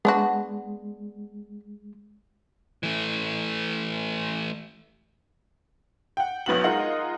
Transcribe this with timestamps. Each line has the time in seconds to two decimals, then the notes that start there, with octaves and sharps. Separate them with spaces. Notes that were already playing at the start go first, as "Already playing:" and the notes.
0.05 G#3 B3 D4 F#4
2.83 E3 A3
6.17 F#5 G5
6.46 B1 B3 F#4 F#7
6.64 G#3 D#4 F4 A#4 D#5 F#5